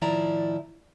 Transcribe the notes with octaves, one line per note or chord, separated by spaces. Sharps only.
A2 D#3 F3 E4 D5 A#5